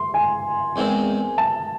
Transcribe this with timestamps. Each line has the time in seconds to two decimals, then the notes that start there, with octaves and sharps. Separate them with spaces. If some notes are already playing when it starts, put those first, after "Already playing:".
Already playing: C6
0.14 G#5
0.76 E2 D#3 G#3 C4
1.38 A5